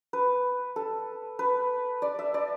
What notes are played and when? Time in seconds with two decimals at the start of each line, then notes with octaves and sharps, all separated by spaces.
0.13 B4
0.76 A4
1.39 B4
2.02 D5
2.19 E5
2.34 D5